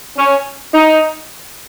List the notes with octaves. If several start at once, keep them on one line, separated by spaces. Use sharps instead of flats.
C#4
D#4